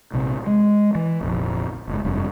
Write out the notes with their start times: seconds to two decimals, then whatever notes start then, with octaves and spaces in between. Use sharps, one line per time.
0.13 A#1 C3
0.47 G#3
0.95 E3
1.21 F1 A#1 F2
1.87 F#1 G#2
2.05 F1 G2